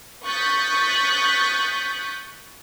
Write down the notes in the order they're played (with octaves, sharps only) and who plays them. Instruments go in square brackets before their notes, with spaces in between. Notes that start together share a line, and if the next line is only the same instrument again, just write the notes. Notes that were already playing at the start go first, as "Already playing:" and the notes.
[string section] C#6 D#6 F#6 G6 A6 B6